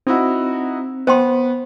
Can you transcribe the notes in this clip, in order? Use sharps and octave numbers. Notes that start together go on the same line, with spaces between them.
C4 D#4 E4 F#4
B3 C5 G5 C6